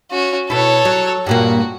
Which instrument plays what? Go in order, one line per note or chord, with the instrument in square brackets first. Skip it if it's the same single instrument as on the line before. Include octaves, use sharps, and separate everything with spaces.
[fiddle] C#4 F#4
[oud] B2 E4 [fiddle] A4 C#5
[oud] F#3
[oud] G2 A#2 A#3 [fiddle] F#4